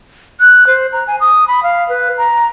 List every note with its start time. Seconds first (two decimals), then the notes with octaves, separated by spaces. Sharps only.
0.40 F#6
0.67 C5
0.93 A#5
1.07 G#5
1.21 D#6
1.48 B5
1.63 F5
1.89 B4
2.18 A#5